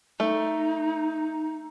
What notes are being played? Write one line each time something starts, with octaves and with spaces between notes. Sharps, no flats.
A3 D#4